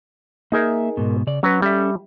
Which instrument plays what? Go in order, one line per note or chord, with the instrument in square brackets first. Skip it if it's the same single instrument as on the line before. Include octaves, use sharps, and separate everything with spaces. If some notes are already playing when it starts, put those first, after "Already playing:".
[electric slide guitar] A#3 E5 [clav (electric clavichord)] D#4 G#4 A#4
[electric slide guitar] G#2 B2
C#3 D5
[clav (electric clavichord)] F#3 F#4 B4 [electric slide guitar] C#4
[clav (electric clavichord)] G3 E5 [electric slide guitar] C#4 A4